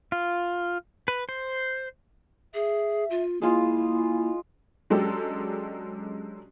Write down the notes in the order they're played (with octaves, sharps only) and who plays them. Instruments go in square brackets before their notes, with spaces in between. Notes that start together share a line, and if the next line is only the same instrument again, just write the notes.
[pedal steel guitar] F4
B4
C5
[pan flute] G#4 [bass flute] E5
[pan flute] F4
[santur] G#3 F4 [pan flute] A#3 [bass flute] E4
[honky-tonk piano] F#3 G#3 C#4 D4 G4 A4